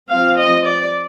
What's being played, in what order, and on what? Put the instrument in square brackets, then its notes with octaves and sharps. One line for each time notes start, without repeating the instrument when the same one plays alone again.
[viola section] F3 C4 F5
D#5
D5